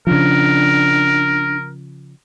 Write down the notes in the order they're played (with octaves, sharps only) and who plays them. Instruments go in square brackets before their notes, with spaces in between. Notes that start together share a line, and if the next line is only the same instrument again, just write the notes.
[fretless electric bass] C#3 F3 [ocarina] D4 [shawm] A#4